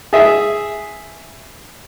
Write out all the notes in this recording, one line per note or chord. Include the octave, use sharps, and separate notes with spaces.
G#4 E5